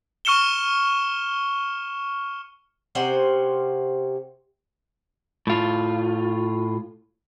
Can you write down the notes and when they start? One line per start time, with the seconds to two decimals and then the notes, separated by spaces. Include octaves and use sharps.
0.25 C#6 F6 C#7 E7 G7
2.95 C3 C#4 C5 F#5
5.47 A2 F4